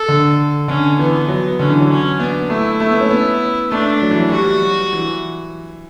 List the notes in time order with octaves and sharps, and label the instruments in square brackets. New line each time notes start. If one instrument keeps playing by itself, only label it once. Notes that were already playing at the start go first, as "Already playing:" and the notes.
Already playing: [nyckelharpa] A4
[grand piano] D3
[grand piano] D3 [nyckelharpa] C#4
[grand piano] E3 [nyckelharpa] B3
[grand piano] F#3
[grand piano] D3 [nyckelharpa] C#4
[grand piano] E3
F#3
[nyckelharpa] C#4
[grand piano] B3 [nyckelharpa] D4
[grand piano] A3 [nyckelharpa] E4
[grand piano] A3
B3
C#4
B3
[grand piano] A3 [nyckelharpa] D4
[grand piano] F#3
E3
F#3
[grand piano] G3 [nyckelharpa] F#4
[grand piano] F#3
E3